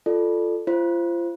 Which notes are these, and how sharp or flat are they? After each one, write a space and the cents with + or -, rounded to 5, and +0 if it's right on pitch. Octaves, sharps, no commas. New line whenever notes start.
F4 +0 A4 +0 D5 +20
F4 -35 C5 +0